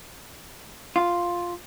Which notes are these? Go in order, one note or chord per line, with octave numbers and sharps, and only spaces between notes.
F4